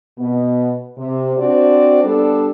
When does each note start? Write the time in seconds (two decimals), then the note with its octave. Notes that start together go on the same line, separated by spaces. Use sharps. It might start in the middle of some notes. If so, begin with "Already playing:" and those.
0.18 B2 B3
0.97 C3
1.37 C4 D4 F#4 C5 D5
2.04 G3 B3 D4 A4